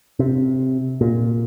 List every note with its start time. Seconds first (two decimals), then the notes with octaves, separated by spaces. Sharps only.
0.19 C3
1.01 A#2